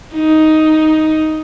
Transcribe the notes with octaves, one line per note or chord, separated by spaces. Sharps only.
D#4